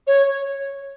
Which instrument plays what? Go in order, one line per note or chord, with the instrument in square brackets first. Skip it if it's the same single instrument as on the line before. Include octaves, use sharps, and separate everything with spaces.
[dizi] C#5